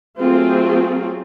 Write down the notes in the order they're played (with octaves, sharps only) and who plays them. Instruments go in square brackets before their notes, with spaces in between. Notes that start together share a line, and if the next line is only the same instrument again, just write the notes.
[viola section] F#3 A3 C4 F4 G#4